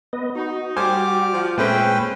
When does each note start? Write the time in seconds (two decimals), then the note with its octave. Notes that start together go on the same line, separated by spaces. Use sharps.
0.13 B3 B4 D#5
0.35 D#4 F#4
0.76 G3 G4 C5 G#5 D6 F6
1.32 F3
1.58 A#2 G#3 A3 C4 C#4 B4 C5 G5